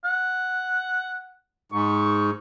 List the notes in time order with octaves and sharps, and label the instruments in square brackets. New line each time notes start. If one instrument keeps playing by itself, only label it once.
[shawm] F#5
[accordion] G#2 [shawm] C#6